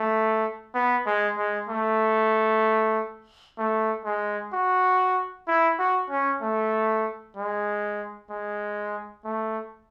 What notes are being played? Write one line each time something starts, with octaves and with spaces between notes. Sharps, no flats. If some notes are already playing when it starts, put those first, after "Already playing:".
Already playing: A3
B3
G#3
G#3
A3
A3
G#3
F#4
E4
F#4
C#4
A3
G#3
G#3
A3